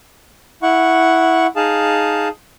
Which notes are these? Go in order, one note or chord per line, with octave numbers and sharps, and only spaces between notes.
E4 F#5 C#6
D#4 G#4 F5 A5